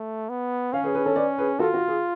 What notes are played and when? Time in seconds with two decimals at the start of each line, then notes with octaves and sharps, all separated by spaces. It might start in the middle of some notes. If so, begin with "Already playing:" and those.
Already playing: A3
0.29 B3
0.73 C#4 C#5 F5
0.84 G#4 B4
0.94 G#4 B4
1.06 A4 C#5
1.16 B4 D5
1.38 G#4 B4
1.59 F4 F#4 A4
1.74 F#4
1.88 G#4